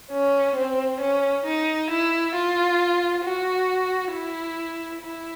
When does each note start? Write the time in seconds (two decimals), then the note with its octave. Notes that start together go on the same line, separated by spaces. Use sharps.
0.11 C#4
0.56 C4
1.00 C#4
1.45 D#4
1.90 E4
2.35 F4
3.24 F#4
4.12 E4
5.02 E4